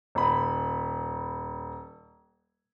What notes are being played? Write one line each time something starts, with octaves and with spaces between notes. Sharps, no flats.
D#1 B5